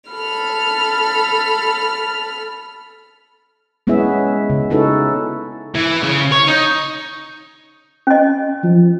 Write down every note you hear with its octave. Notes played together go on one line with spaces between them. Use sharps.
A4 B5 F6
G#3 B3 C#4 E4 G#4 E5
C#3
C#4 D#4 E4 F#4 A4 B4
E3
C#3
C#5
D#4
C#4 D#5
F3